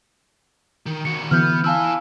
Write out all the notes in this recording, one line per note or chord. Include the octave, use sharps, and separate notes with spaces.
D#3
D#3 F#4 C#7
D3 E3 B3 F6 G6
E4 F5 G#5 A5 E6